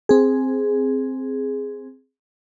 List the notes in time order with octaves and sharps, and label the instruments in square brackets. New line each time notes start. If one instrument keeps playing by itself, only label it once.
[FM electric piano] C4 G#4